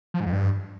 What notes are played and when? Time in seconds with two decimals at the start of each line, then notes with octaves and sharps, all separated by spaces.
0.14 F3
0.20 G#2
0.26 F2
0.32 G2